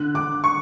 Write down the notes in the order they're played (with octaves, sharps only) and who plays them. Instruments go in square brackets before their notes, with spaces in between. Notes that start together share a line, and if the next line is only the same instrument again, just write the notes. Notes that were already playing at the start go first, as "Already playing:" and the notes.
Already playing: [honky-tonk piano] D3 F#6
D3 D6
C#6